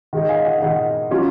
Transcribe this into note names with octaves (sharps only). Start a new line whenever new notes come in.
D#3 G#3 D#4
F5 G#5
D#5 F#5
D#3 G#3 D#4 D#5 F#5
F#3 C#4 F4